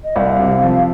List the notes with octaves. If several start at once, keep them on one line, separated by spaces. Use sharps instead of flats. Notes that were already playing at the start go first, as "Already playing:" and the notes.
D#5
C2 F5
C3
F3